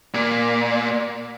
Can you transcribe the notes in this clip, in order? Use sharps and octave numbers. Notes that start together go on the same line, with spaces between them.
A#2